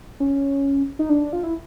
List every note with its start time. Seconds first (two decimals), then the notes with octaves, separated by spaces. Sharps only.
0.20 C#4
0.99 D#4
1.10 D4
1.33 F4
1.43 E4